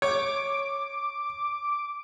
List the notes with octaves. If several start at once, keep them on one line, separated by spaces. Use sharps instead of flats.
C#5 D6